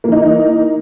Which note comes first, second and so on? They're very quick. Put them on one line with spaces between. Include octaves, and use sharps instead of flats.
A#3 E3 D#4